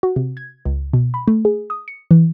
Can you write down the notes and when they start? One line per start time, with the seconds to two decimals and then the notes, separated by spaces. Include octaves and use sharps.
0.03 F#4
0.16 C3
0.37 G#6
0.65 C#2
0.93 B2
1.14 B5
1.28 A3
1.45 G#4
1.70 D#6
1.88 C#7
2.11 E3